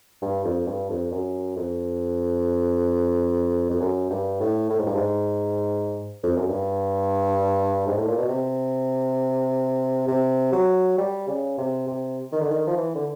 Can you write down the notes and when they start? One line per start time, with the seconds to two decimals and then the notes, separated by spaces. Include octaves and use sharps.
0.22 G2
0.44 F2
0.67 G2
0.90 F2
1.12 F#2
1.57 F2
3.71 F2
3.81 F#2
4.11 G2
4.40 A2
4.70 A2
4.79 G#2
4.87 G2
4.96 G#2
6.23 F2
6.36 F#2
6.49 G2
7.87 G#2
7.98 A2
8.08 A#2
8.18 B2
8.29 C3
10.08 C3
10.53 F#3
10.98 G3
11.28 C#3
11.58 C3
11.88 C3
12.32 D#3
12.41 D3
12.51 D#3
12.67 F3
12.77 E3
12.95 D3